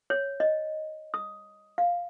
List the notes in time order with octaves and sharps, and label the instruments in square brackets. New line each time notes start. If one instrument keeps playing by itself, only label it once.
[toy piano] C#5
D#5
D#6
F5